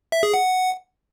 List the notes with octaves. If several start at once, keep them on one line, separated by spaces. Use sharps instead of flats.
E5
G#4
F#5